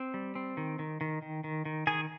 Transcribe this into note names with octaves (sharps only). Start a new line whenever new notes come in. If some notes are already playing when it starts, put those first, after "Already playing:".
Already playing: C4
G3
C4
D#3
D#3
D#3
D#3
D#3
D#3
D#3 G#4 G#5